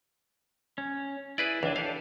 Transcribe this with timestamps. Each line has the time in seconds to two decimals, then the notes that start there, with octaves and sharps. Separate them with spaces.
0.78 C#4
1.38 E4 G#4 B4 D5
1.63 C#2 E3 D4
1.76 D4 G4 A4 F5